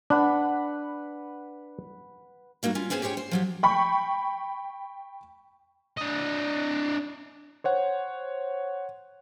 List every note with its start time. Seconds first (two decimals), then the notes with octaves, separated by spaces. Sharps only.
0.10 D4 B4 F#5 B5
2.63 G3 A#3 D#4 F#4
2.75 C#4 F4
2.90 B3 C#4 G#4 C5 G#5
3.02 G4 G#4 C5 C#5 G5
3.17 C5
3.31 F3 F#3 G4
3.63 G5 B5 C#6
5.98 D4 D#5
7.64 C5 C#5 F#5